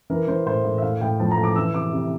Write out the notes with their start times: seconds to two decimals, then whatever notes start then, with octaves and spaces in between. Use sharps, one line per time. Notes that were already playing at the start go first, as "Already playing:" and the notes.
0.10 E3 A#4
0.28 E3 C5
0.46 A2 C5
0.65 A2
0.78 E5
0.82 A2 F5
1.01 A2 G5
1.20 F3 A5
1.31 A#5
1.38 A2
1.44 D6
1.56 E3 E6
1.74 C3 D6
1.92 C3